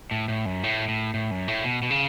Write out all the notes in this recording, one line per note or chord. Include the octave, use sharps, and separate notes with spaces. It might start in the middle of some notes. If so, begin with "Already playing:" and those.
A2
A2
F#2
A2
A2
A2
F#2
A2
B2
B2
C#3